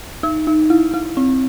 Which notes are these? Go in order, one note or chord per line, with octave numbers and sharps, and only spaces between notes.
D#4
D#4
E4
E4
C4